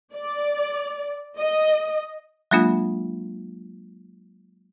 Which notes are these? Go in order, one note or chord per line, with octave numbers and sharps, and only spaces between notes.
D5
D#5
F#3 G#3 A#3 D4 F4